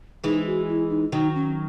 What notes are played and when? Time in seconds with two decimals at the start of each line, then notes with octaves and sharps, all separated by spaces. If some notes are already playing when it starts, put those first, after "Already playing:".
0.24 E3 G#3 D#4
0.46 F#4
0.68 E4
0.90 D#4
1.12 D#3 F#3 D#4
1.35 C#4